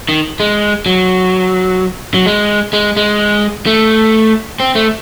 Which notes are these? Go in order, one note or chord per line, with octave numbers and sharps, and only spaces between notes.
D#3
G#3
F#3
F#3
G#3
G#3
G#3
A3
C4
A3